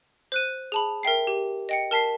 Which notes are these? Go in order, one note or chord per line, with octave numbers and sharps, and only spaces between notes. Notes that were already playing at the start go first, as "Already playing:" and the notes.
C5 F#6 D#7
G#4 A5 B5
A#4 E5 G5 C7
G4
D#5 G5 C#7
A#4 A5 B6 C7